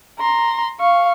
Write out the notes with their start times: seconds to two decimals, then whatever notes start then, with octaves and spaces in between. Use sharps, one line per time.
0.19 A#5 C6
0.80 F5 C#6